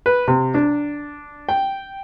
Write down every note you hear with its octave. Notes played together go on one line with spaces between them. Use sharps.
B4
C3
D4
G5